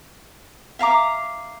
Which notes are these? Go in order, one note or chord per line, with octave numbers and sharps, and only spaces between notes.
E5 F5 A#5 D6